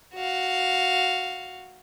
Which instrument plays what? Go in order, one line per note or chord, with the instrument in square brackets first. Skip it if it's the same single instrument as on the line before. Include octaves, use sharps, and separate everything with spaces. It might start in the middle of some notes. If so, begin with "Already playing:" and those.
[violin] F#4 F5